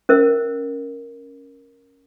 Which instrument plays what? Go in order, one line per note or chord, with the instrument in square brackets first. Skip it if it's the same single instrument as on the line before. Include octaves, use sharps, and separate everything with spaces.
[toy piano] C#4 A#4 E5